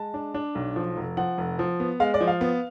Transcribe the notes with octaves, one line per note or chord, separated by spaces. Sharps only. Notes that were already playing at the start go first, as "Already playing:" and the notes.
Already playing: G#3 A5
D4
D4
B1
F3
F1
F3 F#5
F1
F3
B3
G#3 F5
D5
F3
F5
B3